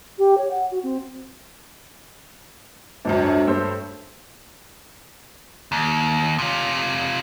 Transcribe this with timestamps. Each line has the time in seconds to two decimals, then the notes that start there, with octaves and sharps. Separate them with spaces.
0.18 G4
0.38 C#5
0.51 F#5
0.71 F#4
0.83 C4
3.05 G#1 C#2 F#2 D4 C5
3.23 A3 C#5
3.47 G2 G4 C5 E6
5.72 D#2
6.38 C3 F4